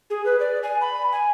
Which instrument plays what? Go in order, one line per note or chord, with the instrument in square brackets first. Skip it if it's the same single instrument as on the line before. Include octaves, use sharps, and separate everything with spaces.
[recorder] G#4
B4
D5
G#5
B5
G#5